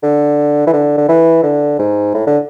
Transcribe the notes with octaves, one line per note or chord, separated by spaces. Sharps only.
D3
E3
D3
D3
E3
D3
G#2
A2
D3